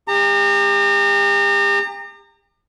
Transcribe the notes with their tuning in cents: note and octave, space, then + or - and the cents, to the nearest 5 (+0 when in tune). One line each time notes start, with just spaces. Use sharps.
G4 +40 A#5 -30